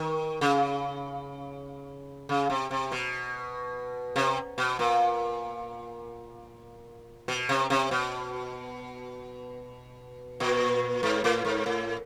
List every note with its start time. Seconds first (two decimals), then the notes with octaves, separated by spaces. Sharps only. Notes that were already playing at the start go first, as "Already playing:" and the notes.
Already playing: D#3
0.41 C#3
2.29 C#3
2.50 C3
2.71 C3
2.92 B2
4.16 C3
4.58 B2
4.79 A#2
7.28 B2
7.49 C3
7.70 C3
7.91 B2
10.40 A#2
11.03 G#2
11.24 A2
11.45 G#2
11.66 A2